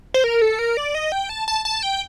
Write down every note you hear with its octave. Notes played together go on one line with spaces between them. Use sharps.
C5
A#4
A4
A#4
D5
D#5
G5
A5
A5
A5
G5